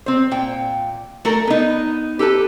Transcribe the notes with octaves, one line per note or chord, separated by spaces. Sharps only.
C4 C5
A#2 G5
A3 A4 A#4
B3 D#4
G4 A4 B4 A5